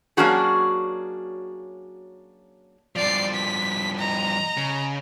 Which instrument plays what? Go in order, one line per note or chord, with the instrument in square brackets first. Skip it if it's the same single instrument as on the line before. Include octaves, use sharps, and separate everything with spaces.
[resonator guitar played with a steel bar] F#3 A#3 C#4 D4 F#4 G#4
[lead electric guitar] G2 F3 [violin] D5 C7
[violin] B6
D#5 A#5
[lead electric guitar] C#3